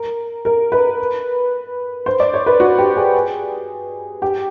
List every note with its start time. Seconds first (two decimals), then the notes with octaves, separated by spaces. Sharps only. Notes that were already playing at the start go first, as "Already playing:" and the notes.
Already playing: A#4
0.45 A#4
0.72 B4
2.06 C5
2.20 D5
2.34 C#5
2.46 B4
2.60 F#4
2.78 G4
2.97 G#4
4.22 G4